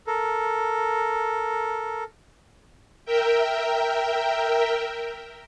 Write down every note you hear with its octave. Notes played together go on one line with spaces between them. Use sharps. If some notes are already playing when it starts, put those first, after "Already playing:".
A4 A#4
A#4 E5 G5